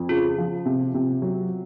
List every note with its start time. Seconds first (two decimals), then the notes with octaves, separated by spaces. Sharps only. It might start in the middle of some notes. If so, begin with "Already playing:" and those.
Already playing: F2
0.09 C#3 F4
0.38 F3
0.66 C3
0.94 C3
1.22 F#3